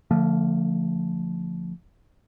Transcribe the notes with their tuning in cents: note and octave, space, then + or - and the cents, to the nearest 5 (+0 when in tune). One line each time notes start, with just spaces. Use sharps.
D3 -15 F3 +0 A3 +35